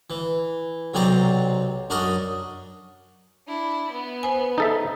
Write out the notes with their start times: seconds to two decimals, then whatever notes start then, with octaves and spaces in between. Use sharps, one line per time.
0.10 E3
0.94 B1 C3 F#3 C4 D5 A#5
1.90 F#2 D4 F#4 A#4 D#5
3.47 D4 E4
3.92 B3
4.23 B4 C5 G#5
4.58 D#4 A4 E5